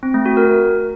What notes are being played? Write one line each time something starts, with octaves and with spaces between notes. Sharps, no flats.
C4
A3
F#4
A#4